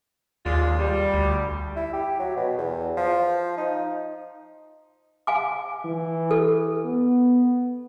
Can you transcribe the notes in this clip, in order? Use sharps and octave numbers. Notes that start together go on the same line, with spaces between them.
D#2 G#3 D4 F4
G3
D2
E4
G4
F#3
B2
E2
F3
D#4
F5 G#5 D6
E3
A4
B3